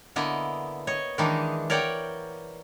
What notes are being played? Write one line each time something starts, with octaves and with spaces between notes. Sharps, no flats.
D3 A#3 B3 E4 D#5
C#5 D#5
D#3 E3 G#3 A#3 D4 D#4
A#4 C#5 D5 F#5 G5